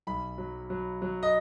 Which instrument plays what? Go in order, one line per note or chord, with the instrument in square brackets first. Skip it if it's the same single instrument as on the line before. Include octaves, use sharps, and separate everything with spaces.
[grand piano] B1 B5
F#3
F#3
F#3
D#5